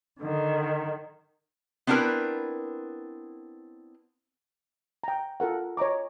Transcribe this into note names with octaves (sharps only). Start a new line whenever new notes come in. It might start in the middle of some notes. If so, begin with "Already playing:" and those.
D3 D#3
B3 C4 D4 E4 A#4 B4
G5 A#5
F4 A4 A#4 F#5
C#5 D#5 A#5 D6